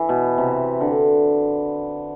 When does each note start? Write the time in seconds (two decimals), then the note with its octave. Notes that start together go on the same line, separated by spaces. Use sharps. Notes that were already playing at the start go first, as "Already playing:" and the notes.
Already playing: E3
0.09 B2
0.38 C3
0.81 D3